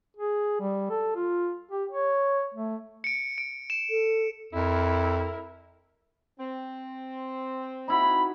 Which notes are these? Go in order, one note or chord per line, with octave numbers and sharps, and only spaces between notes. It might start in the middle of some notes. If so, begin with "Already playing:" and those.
G#4
G3
A4
F4
G4
C#5
A3
C#7 D7
D7
E7
A4
F2 E4 A#4
C4
D#4 E4 F#4 B5